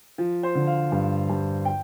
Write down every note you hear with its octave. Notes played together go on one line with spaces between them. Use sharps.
F3
C5
D3
F5
G2
G2
G5